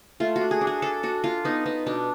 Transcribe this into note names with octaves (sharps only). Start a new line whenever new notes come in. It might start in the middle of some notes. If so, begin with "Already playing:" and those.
A3 F4
F#4
D4
G#4
D4
G#4
D4 A4
D4 F#4
D4 F4
B3 D#4
B3 D#4
B2 D4